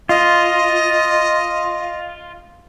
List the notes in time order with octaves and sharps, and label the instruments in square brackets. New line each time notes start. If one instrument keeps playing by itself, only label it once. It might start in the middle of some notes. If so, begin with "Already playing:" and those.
[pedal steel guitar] F4 [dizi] D#5